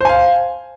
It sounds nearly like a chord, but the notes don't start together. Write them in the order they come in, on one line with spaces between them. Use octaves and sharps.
C5 G#5 F5